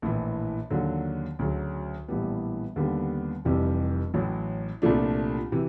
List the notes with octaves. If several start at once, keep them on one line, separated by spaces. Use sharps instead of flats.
A#1 A2 E3
D#2 D3 F#3
D2 C#3 F#3
A#1 A2 E3 G3 B3
D#2 D3 G3 B3
F1 F2 C3 E3 G3
A1 A2 F#3
C2 A#2 F3 A3 D4
C3 E3